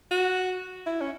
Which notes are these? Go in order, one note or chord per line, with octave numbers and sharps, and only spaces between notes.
F#4
E4
C#4